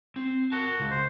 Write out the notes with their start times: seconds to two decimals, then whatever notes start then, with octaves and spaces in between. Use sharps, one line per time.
0.16 C4
0.52 F#4 A#4 A5
0.80 C#2
0.91 C5